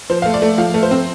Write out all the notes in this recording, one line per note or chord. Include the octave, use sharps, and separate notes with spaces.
F3 C5
A3 F5
D5
A3
F3 F5
A3
C5
C4